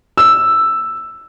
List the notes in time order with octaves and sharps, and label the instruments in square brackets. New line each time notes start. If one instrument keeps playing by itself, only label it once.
[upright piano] E6